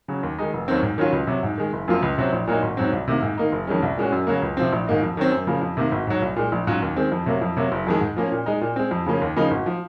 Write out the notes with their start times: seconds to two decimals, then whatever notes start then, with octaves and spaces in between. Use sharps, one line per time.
0.08 C#3 F#3
0.23 D#2
0.38 D#3 G#3 D#4
0.53 F1
0.68 D#2 D#3 F#3 C4
0.83 G#2
0.98 D#3 F#3 C#4 F4
1.12 C#2
1.27 C3 F#3
1.43 G#2
1.58 D#3 G#3
1.73 F#1
1.88 F#2 F3 A#3 F4
2.02 C#2
2.18 C3 F#3 C4
2.33 A#1
2.47 A#2 F#3 A#3 D#4
2.62 G#1
2.77 G#2 F#3 C4
2.92 C2
3.08 C3 D#3 A#3
3.23 G#2
3.37 D#3 A#3 D#4
3.52 F#1
3.67 F2 D#3 G#3 C#4
3.82 C2
3.97 A#2 G#3 C#4 F#4
4.12 F#2
4.27 C#3 F#3 A#3
4.42 C#2
4.57 C3 F3 C4
4.72 A#1
4.87 G#2 D#3 A#3 D#4
5.02 F2
5.17 D#3 F#3 C4
5.32 F#2
5.47 C#3 F3 A#3
5.61 F2
5.77 C3 D#3 A#3
5.92 G#1
6.07 G#2 F#3
6.22 C2
6.36 A#2 G#3
6.52 A#1
6.67 G#2 F#3 C#4 F4
6.82 D#2
6.96 D#3 G#3 C4
7.12 F2
7.26 C3 F#3 A#3
7.42 F2
7.57 C3 F#3 A#3
7.72 F#1
7.87 F2 D#3 G#3
8.01 G#2
8.16 F3 A#3 C#4
8.32 A#2
8.46 G#3 D#4
8.61 A#2
8.76 G#3 C4
8.91 F2
9.06 C#3 F3 A#3 C#4
9.22 D#2
9.36 C#3 F3 A#3 D#4
9.51 G#1
9.66 F3